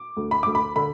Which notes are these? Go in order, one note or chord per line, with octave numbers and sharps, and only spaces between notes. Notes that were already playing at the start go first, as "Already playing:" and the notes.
Already playing: D6
D2
B5
D2 D6
B5
D3 B5